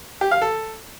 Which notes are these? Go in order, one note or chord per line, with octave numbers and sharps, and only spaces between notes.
G4
F5
A4